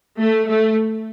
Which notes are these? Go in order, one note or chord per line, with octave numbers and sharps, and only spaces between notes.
A3
A3